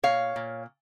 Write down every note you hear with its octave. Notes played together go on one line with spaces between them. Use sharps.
A#2 C#5 F5
A#2